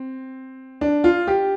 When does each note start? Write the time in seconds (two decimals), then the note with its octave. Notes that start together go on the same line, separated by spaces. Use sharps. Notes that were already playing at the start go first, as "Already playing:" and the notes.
Already playing: C4
0.81 D4
1.04 F4
1.27 G4